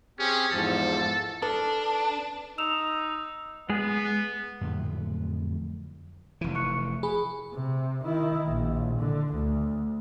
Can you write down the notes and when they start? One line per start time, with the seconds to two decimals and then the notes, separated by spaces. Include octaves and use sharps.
0.19 C4 C#4 G4 G#4
0.52 E2 G#2 F3 A4
1.42 D4 A4 B4
2.58 D#4 E6 E7 F7
3.69 G#3 B3 G#4
4.61 F2 A2 D3 F#3
6.41 F1 E3
6.55 C#6 F#6 C#7
7.03 G#4 B5
7.54 C3
8.04 D#3 E4
8.48 A#1
8.99 D3
9.33 D2